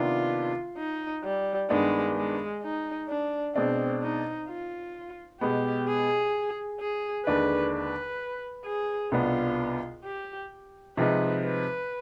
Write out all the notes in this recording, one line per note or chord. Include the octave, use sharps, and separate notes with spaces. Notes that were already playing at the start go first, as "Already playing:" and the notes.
Already playing: C3 D#3 B3 D4 F4
D#4
G3
G2 D#3 G#3 B3 D4
G#3
D#4
D4
B2 G#3 C4 D4
D#4
F4
B2 G#3 B3 G4
G#4
G#4
D#2 D3 G#3 D4 B4
B4
G#4
C2 B2 B3 D4 F4
G4
C3 F3 G#3 C4 D#4 B4
B4